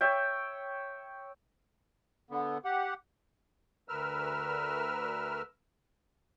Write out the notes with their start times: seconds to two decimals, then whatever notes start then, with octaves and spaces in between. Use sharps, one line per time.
0.01 C#5 E5 G5
2.31 D3 B3
2.65 G4 F#5
3.89 D2 A#4 B4 E6 F6